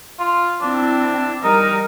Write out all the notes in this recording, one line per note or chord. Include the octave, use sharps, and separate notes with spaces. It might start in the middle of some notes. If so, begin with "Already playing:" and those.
F4
C4 D4 E4
G3 D#4 A#4